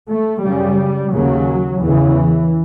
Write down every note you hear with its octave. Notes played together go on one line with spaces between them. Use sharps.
A3
F#2 C#3 G3
D#2 C#3 F#3
E2 C#3 E3